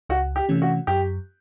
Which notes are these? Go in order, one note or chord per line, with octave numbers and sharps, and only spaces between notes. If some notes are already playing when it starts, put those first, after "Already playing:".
C#2 F#4
G4
C3 E3 A3 C#4
F#4
F#2 G4